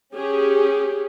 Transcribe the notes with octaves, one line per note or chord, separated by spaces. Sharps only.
C#4 G4 G#4